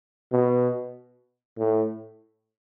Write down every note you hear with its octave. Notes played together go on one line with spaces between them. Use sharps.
B2
A2